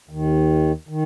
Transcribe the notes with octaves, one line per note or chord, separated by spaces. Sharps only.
D#2 D#3
D#3